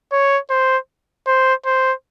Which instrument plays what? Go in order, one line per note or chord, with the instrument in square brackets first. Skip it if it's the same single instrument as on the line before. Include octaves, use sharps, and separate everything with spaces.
[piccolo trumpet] C#5
C5
C5
C5